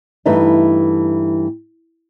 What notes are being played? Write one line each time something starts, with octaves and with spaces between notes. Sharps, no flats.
G2 E3 A3 D#4